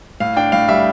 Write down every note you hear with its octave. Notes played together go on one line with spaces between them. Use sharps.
A2 F5
D4 G5
A2 F5
G3 E5